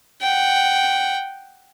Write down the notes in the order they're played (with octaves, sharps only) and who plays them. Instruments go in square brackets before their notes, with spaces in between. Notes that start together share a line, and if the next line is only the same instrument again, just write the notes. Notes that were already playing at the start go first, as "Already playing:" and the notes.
[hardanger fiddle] F#5 G5